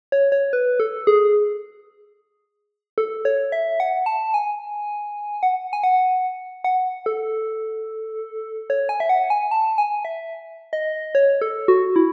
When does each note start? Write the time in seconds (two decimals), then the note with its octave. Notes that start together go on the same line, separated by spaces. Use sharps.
0.12 C#5
0.32 C#5
0.53 B4
0.80 A4
1.07 G#4
2.98 A4
3.25 C#5
3.52 E5
3.80 F#5
4.06 A5
4.34 G#5
5.43 F#5
5.73 G#5
5.84 F#5
6.64 F#5
7.06 A4
8.70 C#5
8.89 G#5
9.00 E5
9.09 F#5
9.30 G#5
9.51 A5
9.78 G#5
10.05 E5
10.73 D#5
11.15 C#5
11.42 A4
11.68 F#4
11.96 E4